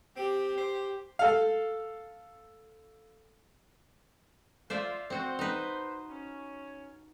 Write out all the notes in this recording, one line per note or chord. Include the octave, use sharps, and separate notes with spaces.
C4 G4
C5
A4 F5
F4 C5 D5 E5
C4 F#4 C5
D#4 B4
C#4